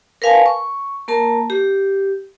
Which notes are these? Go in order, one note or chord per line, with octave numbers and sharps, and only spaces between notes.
A#4 B4 F5 G#5 A5
C#6
A#3 A#4 A5
G4